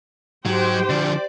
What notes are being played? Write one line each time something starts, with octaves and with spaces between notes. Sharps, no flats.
G#2 F#3 G4 C5 G5
D3 F3 D5